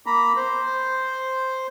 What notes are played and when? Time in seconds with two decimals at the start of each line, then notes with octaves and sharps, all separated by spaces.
0.06 A#3 A#5 B5
0.36 C5